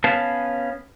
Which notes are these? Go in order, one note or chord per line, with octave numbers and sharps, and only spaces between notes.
B3 C#4 B4 F5 A5